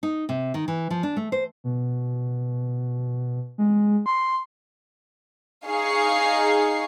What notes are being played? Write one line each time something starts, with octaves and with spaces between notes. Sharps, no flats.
D#4
C3
D#3
E3
F3
D4
A3
C5
B2
G#3
C6
D#4 G#4 F5 C#6 C7